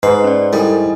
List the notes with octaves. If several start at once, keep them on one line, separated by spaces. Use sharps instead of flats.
G#2 B4 D#5 C7
C#4 D5
G3 E4 A4 A#4 D#5 G#5 D#6